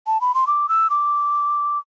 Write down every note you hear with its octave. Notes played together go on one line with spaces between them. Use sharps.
A5
B5
C6
D6
E6
D6